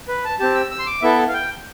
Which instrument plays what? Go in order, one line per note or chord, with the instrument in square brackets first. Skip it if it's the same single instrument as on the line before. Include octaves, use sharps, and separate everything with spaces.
[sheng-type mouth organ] B4
A5
C4 G4 A5
E6
E6
C6
D6
B3 E4 A4 E5
F5
G5